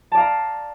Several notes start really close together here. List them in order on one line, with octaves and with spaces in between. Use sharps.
A5 D5 F5 A#5